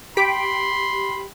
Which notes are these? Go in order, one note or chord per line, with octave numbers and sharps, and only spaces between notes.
G4 B5 C6 B6 D7